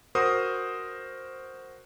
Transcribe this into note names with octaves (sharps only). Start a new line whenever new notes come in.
F#4 A#4 C5 D#6